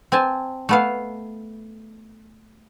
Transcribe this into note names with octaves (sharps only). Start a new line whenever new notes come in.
C4 G#5 A5
A3 B3 F5